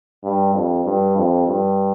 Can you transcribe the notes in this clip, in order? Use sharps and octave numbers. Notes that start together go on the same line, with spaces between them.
G2
F2
G2
F2
G2